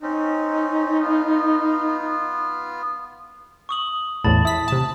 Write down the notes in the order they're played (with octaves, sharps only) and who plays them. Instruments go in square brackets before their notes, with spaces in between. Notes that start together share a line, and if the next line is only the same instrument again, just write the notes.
[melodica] C4 C#4 [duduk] D#4
[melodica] B3 F4
[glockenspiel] C#6 D#6 F#7
[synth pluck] A1 E2 A2 [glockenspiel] A5 B5 A6
[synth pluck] E4 B6 [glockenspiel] D#6
[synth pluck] C3 A5